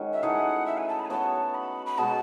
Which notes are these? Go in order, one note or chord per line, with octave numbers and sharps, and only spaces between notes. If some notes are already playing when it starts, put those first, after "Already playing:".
Already playing: D#3 G#3 C#4 F#4
E5
E3 A3 D#4 G#4 F#5
E5
G#5
A5
B5
G#5
B3 F#4 C#5 A5
B5
B5
B2 G#3 B3 F#4 A5